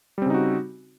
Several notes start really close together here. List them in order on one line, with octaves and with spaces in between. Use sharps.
G3 C4 C#3 D#4 F#4